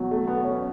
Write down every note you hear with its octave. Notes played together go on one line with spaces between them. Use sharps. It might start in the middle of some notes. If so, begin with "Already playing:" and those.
Already playing: E2 B2 F#3
A3
B3
C#4